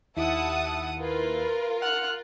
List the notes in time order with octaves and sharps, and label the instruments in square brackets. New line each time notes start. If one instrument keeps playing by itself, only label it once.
[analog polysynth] D#2 E4 [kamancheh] E5 [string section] F#5 A5 D#6
[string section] F4 [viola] A#4 [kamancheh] B4
[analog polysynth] F#5 [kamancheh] F6 F#6